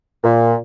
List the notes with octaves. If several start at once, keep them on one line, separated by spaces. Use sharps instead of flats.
A#2